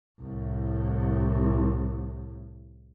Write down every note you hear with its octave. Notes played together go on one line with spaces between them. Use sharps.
C2 A2